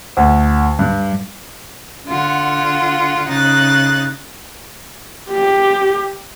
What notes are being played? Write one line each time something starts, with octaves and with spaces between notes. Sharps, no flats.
D2
G2
D3 F4 F#5
C#3 D#4 F#6 A6
G4